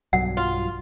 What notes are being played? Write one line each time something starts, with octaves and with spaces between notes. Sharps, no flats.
B1 G2 F#3 F#5
F4